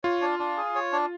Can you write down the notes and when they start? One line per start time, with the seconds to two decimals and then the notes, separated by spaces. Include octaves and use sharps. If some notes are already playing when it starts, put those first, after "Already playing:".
0.04 F4 C#5
0.21 D4
0.39 D4
0.57 G#4
0.75 C#5
0.92 D4